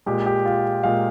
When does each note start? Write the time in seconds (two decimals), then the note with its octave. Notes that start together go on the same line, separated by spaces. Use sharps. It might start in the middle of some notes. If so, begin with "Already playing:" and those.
0.06 A#2 G#3 G4
0.26 G4
0.46 F4
0.83 A#2 G#3 F5